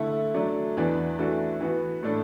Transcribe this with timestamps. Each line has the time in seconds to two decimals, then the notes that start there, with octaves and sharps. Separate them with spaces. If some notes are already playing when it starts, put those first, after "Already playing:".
Already playing: D3 A3 E4 A4
0.34 F#3 A3 D4
0.77 E2 E3 D4 B4 D5
1.19 E3 A3 D4 F#4 A4
1.60 E3 B3 F#4 B4
2.03 A2 A3 D4 A4